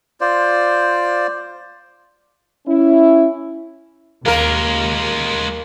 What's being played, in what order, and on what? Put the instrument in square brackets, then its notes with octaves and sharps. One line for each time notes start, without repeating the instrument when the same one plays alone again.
[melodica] F4 C5 D5
[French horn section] C#4 E4
[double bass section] D#2 [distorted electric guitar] G#3 F4 [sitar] A#3 A#4